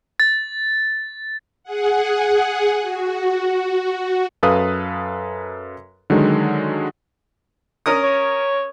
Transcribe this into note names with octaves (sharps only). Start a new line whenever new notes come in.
A6
G#4 F#5
F#4
F#2 A4 B4 F5 D#6 F#6
D3 D#3 F#3 G#3
C#4 A#4 D#6
C#5